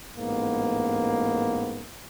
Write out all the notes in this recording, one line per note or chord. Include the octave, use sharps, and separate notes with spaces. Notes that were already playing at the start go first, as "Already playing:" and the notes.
A1 G#2 A#3 B3